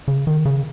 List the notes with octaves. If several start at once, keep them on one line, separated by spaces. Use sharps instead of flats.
C#3
D#3
C#3